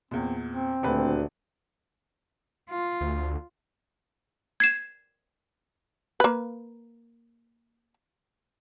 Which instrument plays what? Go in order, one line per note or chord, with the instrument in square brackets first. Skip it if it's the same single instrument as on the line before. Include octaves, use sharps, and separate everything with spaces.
[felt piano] E2 A#2 [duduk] C4
[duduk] C4
[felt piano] D#1 B4 [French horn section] D2
[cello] F4
[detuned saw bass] D2
[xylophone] G#6 C7 E7
[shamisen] A#3 B4